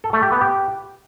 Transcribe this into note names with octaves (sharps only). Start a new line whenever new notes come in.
A4
A3
G4
B3
G4